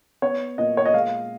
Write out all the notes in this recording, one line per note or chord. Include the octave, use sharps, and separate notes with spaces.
B3 C#5
A#2 D#5
C#5
D#5
G#3 F5